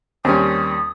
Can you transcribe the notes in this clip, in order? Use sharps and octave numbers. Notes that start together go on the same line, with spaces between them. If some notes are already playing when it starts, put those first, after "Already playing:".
D#2 G3 C4 C#4 D#6